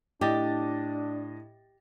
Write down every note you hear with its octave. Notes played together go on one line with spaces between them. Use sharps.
A2 D4 G4 D#5 A6